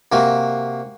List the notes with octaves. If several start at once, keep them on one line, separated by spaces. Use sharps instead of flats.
C3 A#3 F#4